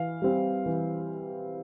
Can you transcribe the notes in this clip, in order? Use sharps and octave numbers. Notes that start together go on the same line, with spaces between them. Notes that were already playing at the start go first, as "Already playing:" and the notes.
Already playing: E3 F5
G3 C4
E3